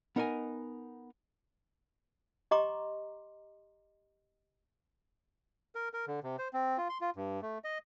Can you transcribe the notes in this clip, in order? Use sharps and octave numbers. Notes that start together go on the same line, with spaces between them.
B3 D#4 A#4 D#5 G#5
G4 D#5 A#5 C6 D6
A#4
A#4
D3
C3
C5
C4
F4
C6
F4
G2
A3
D#5